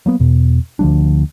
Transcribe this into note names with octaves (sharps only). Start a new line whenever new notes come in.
F#3 A#3 B3
E2 B2
D2 F3 G3 D4